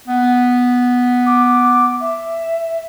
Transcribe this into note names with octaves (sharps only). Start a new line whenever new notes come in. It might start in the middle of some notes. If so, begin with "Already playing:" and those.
B3
D6
E5